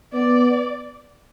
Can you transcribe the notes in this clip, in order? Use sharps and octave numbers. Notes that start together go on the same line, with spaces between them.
B3 D5